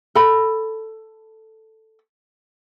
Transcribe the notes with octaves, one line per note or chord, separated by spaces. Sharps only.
A4 B5